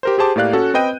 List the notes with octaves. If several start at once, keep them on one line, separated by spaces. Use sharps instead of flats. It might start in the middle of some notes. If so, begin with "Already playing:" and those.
G4 A#4 C5
G4 G#4 C5 A5 D6
A2 A#3 G4 D5 F5 F#6
C#4 F#4 A4
C4 B4 D#5 G5 G6 D#7